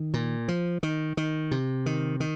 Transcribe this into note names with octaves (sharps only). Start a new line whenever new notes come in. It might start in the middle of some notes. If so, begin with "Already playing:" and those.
Already playing: D#3
A#2
F3
D#3
D#3
C3
D#3
D#3